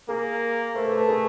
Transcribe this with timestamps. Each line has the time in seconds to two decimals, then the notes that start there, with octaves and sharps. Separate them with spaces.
0.08 A#3 G#4 A#4
0.75 A3 A#4 C5
0.86 A4 B4
0.98 A4 B4
1.09 G#4 A#4